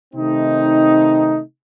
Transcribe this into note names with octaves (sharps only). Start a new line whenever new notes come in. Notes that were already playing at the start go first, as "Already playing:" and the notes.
C3 D#3 A3 C4 D#4